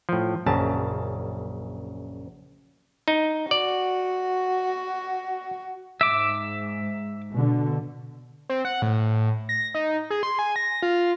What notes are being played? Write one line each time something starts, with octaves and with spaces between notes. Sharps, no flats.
A2 F3
A#1 F#2 C#3 A5
D#4
F#4 D5
G#2 E5 D6
B2 D3
C4
F#5
A2
A#6
D#4
G#4
C6
G#5
A#6
F4